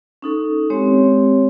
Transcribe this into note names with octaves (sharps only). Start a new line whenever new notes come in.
C#4 D#4 A4
G#3 C4 G4 C#5